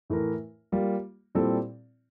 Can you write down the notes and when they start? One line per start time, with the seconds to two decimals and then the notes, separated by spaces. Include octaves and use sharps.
0.10 A2 E3 A3 E4 A#4
0.72 G3 A#3 F4
1.35 A#2 G3 C4 E4 A4